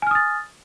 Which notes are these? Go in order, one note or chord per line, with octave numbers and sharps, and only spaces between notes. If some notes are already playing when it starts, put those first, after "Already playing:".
G#5 D#6 F6 A6